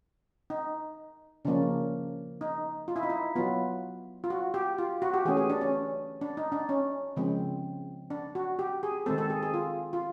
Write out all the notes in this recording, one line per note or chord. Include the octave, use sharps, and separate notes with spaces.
D#4
C#3 F3 A#3 C#4 D4
D#4
F4
E4
D#4
E4
F#3 B3 F4
F4
F#4
G4
F4
F#4
G4
E3 A3 C#4 G#4
G#4
D4
C#4
D4
D#4
D4
C#4
C#3 F3 G#3 C4
D4
F#4
G4
G#4
D#3 G#3 C4 A4
A4
G#4
G#4
F4
F4